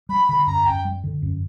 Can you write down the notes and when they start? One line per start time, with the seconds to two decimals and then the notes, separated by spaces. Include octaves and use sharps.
0.09 G3 B5
0.28 D3 B5
0.47 F#2 A#5
0.66 F#2 G5
0.85 G3
1.04 D3
1.22 F#2